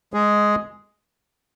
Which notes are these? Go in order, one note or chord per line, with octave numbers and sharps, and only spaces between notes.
G#3 G#4